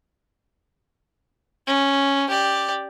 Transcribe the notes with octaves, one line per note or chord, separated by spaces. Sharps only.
C#4
G4 D5